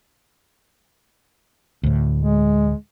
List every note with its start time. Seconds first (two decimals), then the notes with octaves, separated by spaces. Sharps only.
1.83 D2 A2
2.20 G#3